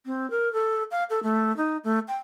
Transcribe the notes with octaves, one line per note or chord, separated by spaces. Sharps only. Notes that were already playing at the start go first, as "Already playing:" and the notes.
C4
A#4
A4
F5
A4
A3
D#4
A3
G5